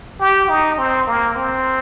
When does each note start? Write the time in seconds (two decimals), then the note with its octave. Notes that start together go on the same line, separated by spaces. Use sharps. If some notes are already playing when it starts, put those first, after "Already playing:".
0.20 G4
0.49 D#4
0.78 C4
1.07 A#3
1.36 C4